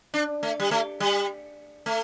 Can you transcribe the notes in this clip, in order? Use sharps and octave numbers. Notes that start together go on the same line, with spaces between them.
D4
A3
G3
A3
G3
A3